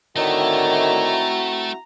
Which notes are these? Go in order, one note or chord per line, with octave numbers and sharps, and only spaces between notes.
A2 D3 D#3 A3 C4 E4 F#4 A#5